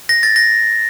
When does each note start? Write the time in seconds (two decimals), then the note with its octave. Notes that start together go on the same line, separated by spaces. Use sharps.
0.09 A#6
0.23 A6
0.36 A#6